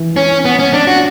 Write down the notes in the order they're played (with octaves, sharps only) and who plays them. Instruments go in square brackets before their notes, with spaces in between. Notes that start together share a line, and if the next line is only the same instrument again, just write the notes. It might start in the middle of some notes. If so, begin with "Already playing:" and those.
Already playing: [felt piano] E3
[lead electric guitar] C#4
B3
C#4
D4
F#4